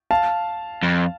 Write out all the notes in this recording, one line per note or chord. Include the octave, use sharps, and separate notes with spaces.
F5 A5
F2